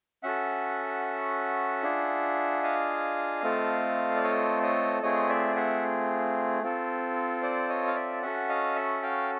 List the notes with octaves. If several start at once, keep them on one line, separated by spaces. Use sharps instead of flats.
C#4 F#4 A4 E5 F#5
D4 F4 G#4
D#5 F5
A3 C4 F4 A4
D5
C#5 D#5
C#5 D#5
A3 C4 F4 G#4 C#5 D#5
D5 E5
E5 F#5
C4 F4 A4
C5 D5
C#5 D#5
F5
D5 E5
C#4 F#4 A4 E5 F#5
D#5 F5
E5 F#5
F5 G5